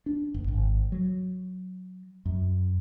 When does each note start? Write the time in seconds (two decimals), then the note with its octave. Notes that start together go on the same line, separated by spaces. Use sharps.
0.06 D4
0.34 F#1
0.48 G#1
0.92 F#3
2.25 F#2